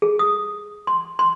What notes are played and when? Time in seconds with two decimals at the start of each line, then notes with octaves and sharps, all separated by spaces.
0.02 G#4
0.19 D#6
0.87 C6
1.19 C6